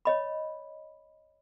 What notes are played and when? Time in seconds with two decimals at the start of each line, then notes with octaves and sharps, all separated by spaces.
0.05 C#5 D#5 B5